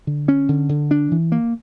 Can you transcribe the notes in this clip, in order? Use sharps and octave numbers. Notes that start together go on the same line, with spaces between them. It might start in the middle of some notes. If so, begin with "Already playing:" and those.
D3
C#4
D3
D3
D4
E3
A#3